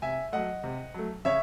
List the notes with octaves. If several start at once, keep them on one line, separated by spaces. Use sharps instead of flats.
C3 E5 G#5
F#3 A3 D#5 F#5
C3
F#3 A3
C#3 C#5 E5